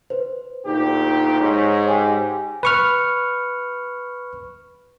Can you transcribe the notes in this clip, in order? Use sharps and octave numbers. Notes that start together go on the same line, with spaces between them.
B4 C5
D2 A#2 D#4 G4
G#2 C#5
G4 G#5
B4 C#6 F6